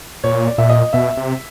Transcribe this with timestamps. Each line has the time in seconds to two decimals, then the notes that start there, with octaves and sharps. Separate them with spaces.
0.24 A#2 C#5
0.47 D5
0.58 A#2 E5
0.70 D#5
0.93 B2 E5
1.17 C3